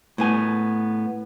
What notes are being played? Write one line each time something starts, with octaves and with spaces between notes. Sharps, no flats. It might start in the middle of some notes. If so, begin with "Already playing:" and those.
A2 B3 G#5